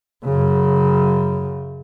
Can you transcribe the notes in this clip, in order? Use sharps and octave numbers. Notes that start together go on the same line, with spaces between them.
F#2 C#3